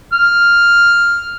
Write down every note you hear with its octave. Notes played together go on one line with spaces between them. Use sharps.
F6